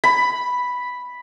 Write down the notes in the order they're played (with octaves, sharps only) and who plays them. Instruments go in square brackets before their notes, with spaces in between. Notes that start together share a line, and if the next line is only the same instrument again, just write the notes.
[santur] B5